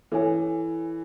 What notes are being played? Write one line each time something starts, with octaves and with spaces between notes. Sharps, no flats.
E3 A4 C#5 G#5